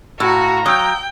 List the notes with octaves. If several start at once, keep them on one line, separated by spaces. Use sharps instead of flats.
A2 F#4 F5 A#5 E6
F#3 G5 D#6 E6 G6